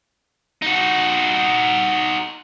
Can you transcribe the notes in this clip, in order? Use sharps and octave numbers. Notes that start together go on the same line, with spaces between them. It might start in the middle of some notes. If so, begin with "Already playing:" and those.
D#4 F#4